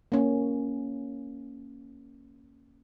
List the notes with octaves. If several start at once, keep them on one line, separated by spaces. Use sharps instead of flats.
A#3 C#4